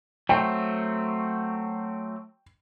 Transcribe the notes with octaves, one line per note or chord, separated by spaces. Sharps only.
F#3 A3 C4 G5